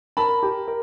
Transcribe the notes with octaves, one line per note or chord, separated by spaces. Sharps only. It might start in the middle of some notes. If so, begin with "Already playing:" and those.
A#4 A5 B5
G4
A#4